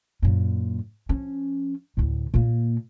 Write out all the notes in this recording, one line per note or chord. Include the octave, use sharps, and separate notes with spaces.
F#2 A#2
F3 C#4
D2 A2
A#2 A#3